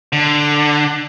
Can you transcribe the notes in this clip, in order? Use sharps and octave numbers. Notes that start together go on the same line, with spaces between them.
D3